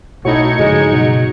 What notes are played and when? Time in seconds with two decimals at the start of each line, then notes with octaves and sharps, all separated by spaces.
0.25 B1 A2 D#4 F#4 C#5 G#6 C#7
0.59 G2 C#3 F3 G#3
0.91 B2 F#3